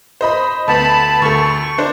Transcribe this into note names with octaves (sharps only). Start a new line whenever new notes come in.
C5 D#5 B5
D2 B3 A5 B5
D2 A4 C#6
D4 C5 D5